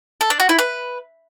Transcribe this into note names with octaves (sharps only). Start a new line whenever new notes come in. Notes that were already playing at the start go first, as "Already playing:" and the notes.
A4
D4
F#4
E4
B4